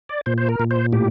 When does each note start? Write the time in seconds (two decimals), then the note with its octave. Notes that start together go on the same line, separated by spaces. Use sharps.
0.09 D5
0.26 A#2 C5
0.38 C5
0.49 A#4
0.60 A#2
0.71 C5
0.92 A2 G4